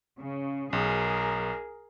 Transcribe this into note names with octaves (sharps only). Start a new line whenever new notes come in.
C#3
B1 G#4 A#4